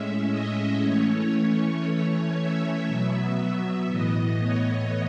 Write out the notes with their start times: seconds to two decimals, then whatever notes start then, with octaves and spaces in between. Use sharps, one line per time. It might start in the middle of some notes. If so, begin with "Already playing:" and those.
Already playing: A2 G#3 C#4 E5
0.30 D#5
0.81 E3 A3 C#4 C#5
1.84 E3 A3 C#4 C#5
2.35 E5
2.86 B2 F#3 B3 E5
3.89 A2 E3 B3 D#5
4.40 C#5